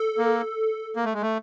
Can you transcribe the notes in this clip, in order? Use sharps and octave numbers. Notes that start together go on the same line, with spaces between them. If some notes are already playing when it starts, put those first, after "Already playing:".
Already playing: A4
A#3
A#3
A3
G#3
A3